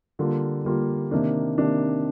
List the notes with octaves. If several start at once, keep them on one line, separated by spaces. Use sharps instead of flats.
D3 G3 A#3 F4
D3 G3 A#3 F4
C3 D#3 A#3 D4
C3 D#3 A#3 D4